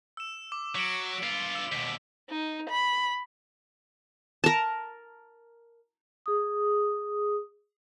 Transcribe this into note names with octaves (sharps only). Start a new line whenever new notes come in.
E6 E7
D6
F#3 B6 C#7 D7
G2 F4
E6
D#2 B2 B6
D#4
B5
A#4 A5
G#4 D#6